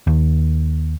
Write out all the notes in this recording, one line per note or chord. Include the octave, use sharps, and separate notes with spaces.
D#2